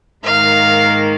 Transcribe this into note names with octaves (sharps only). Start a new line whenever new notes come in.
G#2 D#3 A#3 F5